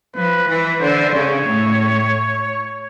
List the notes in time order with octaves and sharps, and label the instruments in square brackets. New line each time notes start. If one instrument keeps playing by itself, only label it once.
[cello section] F3 [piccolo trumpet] B4
[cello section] E3 [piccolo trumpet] B4
[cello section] D3 [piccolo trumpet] C5
[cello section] C#3 [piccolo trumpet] C#5
[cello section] A2